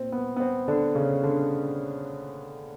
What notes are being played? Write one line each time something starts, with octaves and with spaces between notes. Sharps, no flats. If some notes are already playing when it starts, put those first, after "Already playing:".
Already playing: A#2 C4
B3
B3
C4
D3 D4
C#3 C#4
D3 D4